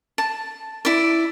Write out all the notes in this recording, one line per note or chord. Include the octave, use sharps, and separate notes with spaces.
A5
E4 D5